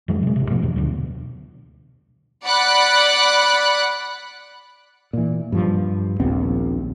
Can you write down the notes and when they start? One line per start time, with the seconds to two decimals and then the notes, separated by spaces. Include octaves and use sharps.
0.08 F2 D#3 F#3 G#3
0.23 C3 G#3
0.36 A1 C3
0.50 B2 F3 A3
0.62 E2 B2 F#3
0.76 D2 B2 D3
2.45 D5 F#5 B5 F#6
5.13 A#2 E3
5.52 G2 F3
6.20 A#1 D#2 B3 C4